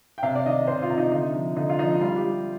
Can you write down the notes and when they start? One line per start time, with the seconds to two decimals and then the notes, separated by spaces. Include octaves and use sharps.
0.18 G5
0.23 C3 F5
0.35 D5
0.46 D#3 D#5
0.67 C3 C5
0.82 F4
0.90 C3
0.98 D#4
1.12 D3 D#4
1.34 F3
1.56 D3 D#4
1.69 F4
1.79 F3 D#4
2.01 G3 F4
2.16 G4
2.23 G3